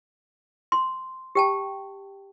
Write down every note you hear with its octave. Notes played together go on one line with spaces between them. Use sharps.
C6
G4 G5 A5